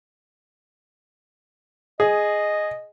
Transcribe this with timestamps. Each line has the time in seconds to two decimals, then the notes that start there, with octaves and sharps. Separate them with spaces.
2.00 G#4 D#5